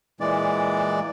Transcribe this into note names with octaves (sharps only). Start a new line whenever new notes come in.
A#2 E3 G#3 D5